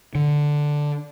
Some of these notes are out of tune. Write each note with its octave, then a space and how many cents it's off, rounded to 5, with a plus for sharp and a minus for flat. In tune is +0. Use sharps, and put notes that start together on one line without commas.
D3 +0